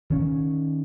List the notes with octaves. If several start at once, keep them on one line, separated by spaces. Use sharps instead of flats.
D#3 C#4